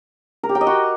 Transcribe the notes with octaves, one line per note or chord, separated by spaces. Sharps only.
A#4
G4
G5
D#5
F#4